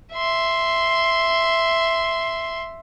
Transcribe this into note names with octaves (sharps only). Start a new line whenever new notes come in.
E5 C6